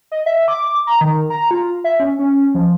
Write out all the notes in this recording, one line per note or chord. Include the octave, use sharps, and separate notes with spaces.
D#5
E5
D6
A#5
D#3
A#5
F4
E5
C#4
C#4
F3